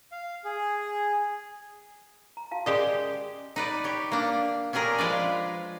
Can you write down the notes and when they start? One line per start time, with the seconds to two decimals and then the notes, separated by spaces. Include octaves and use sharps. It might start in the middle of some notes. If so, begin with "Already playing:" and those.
0.12 F5
0.44 G#4
2.37 A#5
2.51 F#4 F5 A5
2.66 G#3 C#4 G4 A#4 D5 D#5
3.56 D#4 B4 D5
3.84 G4 C#5
4.12 A#3 D4
4.73 C#4 D4 G4 G#4 A#4
4.98 F3 G#3 B4 D5